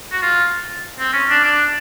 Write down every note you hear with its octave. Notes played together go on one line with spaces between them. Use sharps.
F#4
F4
C4
C#4
D4
D4